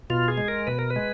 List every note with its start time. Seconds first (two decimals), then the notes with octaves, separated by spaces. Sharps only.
0.10 B2 F4
0.28 G#4
0.38 G#3
0.48 A#4
0.67 B2 B4
0.79 A#4
0.90 B4
0.96 G#3